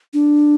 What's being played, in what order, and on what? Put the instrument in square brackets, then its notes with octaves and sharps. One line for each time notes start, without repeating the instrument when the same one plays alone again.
[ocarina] D4